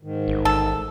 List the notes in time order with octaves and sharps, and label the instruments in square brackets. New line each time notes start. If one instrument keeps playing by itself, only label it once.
[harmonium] G#2 D#3
[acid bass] A1
[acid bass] A1 [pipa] A4